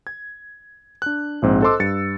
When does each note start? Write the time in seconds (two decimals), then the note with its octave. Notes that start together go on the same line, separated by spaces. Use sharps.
0.07 G#6
1.02 D4 F#6
1.42 A#1 G#2 C4
1.62 A4 C5 D#5 C6 D6 E6
1.80 G2 A6 C#7